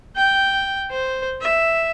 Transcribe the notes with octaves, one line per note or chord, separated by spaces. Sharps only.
G5
C5
E5